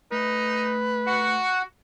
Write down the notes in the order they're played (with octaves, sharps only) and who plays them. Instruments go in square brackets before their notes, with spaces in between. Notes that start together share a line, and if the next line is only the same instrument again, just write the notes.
[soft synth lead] A3 [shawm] D#4 [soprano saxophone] B4
[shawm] F#4 [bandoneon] F#5